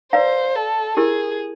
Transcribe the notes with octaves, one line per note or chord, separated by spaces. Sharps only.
B4 C5 D5 F5 A#5
A4
E4 G4 G#4 A#4